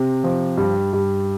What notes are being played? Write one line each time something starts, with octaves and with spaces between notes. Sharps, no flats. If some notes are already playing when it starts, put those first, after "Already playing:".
Already playing: C3
F3
G2
G2